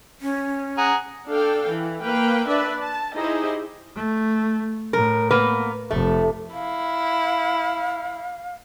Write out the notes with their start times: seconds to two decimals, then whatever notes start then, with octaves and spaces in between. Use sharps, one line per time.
0.21 C#4
0.78 G#4 F#5 A#5
1.27 D4 A4 F5 G5
1.67 E3
2.04 A#3 B4 F5 G5
2.48 D4 B4 D5 E5
2.81 A5
3.14 D#4 E4 G4 G#4 C5 D#5
3.96 A3
4.93 A2 A#4
5.31 A#3 B3 B4
5.91 F1 A3
6.53 E4 F5